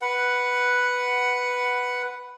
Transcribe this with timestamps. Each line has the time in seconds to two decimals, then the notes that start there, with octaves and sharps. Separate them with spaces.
0.02 B4 F#5